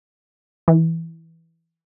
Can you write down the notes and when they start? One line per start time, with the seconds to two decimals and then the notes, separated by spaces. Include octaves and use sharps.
0.68 E3